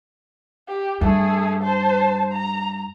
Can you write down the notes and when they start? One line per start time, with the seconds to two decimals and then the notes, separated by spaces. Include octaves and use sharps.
0.68 G4
1.01 G2 A3 G#4
1.63 C5 A5
2.32 A#5